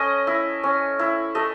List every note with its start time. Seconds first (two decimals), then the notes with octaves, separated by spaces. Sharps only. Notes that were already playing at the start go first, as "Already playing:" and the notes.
Already playing: A3 C#4 D#5
0.27 E4
0.63 C#4
0.99 E4
1.35 A3 D#5